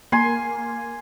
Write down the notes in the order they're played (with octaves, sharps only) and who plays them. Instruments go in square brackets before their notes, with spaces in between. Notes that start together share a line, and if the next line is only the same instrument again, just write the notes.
[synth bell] A#3 [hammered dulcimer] G#5 C6